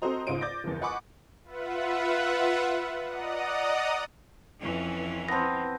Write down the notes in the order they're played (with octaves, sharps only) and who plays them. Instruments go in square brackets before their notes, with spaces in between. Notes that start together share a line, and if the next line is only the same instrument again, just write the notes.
[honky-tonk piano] C4 F#4 A4 C5 D#5 A#5
C#2 G#2 C5 D#5 D7 D#7
D5 D6 G6 A6 A#6
F#1 E2
D#5 F#5 G#5 B5 C#6 D6
[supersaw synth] F4 B4 E5 F#5
D5 D#5 F#5 A#5 D#6
[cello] F2 C#4 [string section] E3
[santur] B3 C4 [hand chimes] A5 A#6